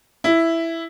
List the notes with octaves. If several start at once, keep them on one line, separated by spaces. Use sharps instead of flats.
E4